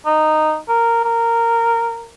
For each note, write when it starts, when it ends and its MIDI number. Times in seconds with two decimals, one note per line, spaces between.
0.06 0.57 63
0.69 1.02 70
1.05 2.11 70